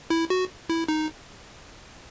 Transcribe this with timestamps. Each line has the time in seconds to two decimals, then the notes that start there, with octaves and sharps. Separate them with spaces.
0.10 E4
0.30 F#4
0.70 E4
0.88 D#4